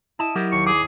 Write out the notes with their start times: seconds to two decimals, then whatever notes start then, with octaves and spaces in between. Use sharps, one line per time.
0.19 E4 D#5 A5 E7
0.35 F#3 G4 A#4
0.52 D#2 C#6
0.67 G#4 D6